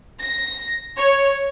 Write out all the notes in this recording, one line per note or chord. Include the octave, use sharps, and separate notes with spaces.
A#6
C#5